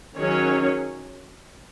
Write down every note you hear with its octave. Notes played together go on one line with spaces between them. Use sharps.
D#3 F#3 C#4 G#4 C#5